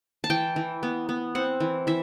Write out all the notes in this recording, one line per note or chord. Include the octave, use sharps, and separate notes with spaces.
A5
E3 G5
E3
B3
B3
C4 F#5
E3
E3 E5